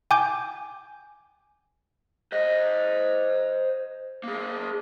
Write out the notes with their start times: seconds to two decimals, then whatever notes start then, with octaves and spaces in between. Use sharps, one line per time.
0.11 G5 G#5 D6 G6
2.32 C5 D#5
4.24 A#3 G#4